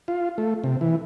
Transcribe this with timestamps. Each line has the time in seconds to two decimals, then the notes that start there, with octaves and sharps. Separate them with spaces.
0.08 F4
0.38 A3
0.64 C3
0.81 E3